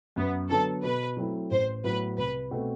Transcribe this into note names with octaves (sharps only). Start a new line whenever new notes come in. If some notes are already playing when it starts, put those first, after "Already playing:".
F#2 B3
D3 F#3 B3 A4
B2 B4
F#3 A3 C4 E4
A1 C5
A2 F#3 B3 F#4 B4
C2 B4
B2 A3 C4 F#4